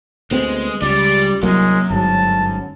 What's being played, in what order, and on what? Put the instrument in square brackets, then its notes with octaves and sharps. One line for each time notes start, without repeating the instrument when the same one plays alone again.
[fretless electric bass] D2 B3 C4 [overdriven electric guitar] G#3
[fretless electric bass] C#2 [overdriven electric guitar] G3 [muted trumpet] D5
[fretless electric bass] C2 F#3 A#3 [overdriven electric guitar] F#2 [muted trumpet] G#3
[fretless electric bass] G1 G#2 F#3 [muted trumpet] A5